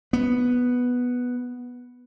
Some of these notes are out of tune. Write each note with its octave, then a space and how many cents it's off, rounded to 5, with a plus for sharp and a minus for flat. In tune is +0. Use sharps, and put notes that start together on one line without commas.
B3 -5